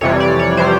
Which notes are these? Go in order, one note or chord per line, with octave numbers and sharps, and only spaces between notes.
F2 C3 E3 G3 C#5
D5
C#5
C3 E3 G3 C5